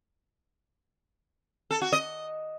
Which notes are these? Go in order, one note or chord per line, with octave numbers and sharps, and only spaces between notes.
A4
F#4
D#5